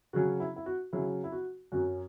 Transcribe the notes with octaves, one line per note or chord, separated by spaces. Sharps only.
C#3 F#3 C#4 F#4
E4
E4
F#4
C#3 F#3 C#4 E4
E4
F#4
F#2 F#3 C#4 F#4